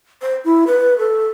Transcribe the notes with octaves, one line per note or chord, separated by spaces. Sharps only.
C5
E4
B4
A4